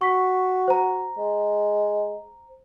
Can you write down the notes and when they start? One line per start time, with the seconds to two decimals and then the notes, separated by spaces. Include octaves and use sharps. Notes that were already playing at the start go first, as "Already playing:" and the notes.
0.01 F#4 C#6 B6
0.68 C5 A#5
1.18 G#3